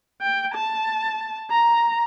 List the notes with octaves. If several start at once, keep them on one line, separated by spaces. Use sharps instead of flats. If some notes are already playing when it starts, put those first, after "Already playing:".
G5
A5
A#5